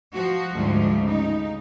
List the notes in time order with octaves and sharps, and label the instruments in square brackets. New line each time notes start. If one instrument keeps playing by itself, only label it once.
[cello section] F3 F#4
D2 G#2 F3 G3
C#3 D#4